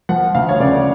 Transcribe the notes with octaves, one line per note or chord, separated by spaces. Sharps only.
F3 F#5
D2 F5
C#5
C#3 D5